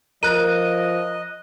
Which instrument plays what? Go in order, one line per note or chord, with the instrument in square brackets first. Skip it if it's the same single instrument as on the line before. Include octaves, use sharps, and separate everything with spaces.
[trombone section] F3 [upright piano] A#4 [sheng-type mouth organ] D#5 [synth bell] F#6 D#7